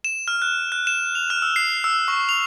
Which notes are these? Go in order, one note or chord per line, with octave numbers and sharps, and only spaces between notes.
E7
F6
F#6
F#6
E7
F7
F6
E6
C7
E6
C#6
F7